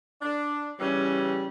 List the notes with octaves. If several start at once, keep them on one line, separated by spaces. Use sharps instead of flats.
D4
C#3 E3 G3 C#4